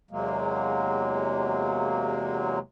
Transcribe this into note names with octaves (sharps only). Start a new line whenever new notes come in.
E2 C3 F#3 G#3 A#3